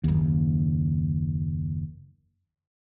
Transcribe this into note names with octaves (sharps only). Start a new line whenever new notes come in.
F#1 D#2